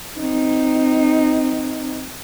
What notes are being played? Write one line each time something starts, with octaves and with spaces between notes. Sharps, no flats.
C4 D#4